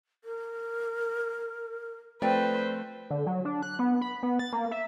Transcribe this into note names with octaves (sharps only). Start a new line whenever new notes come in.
A#4
F3 A3 C4 B4 C5 D5 G5
D3
F#3
D4
F#6
B3
B5
B3
A6
A#3
E5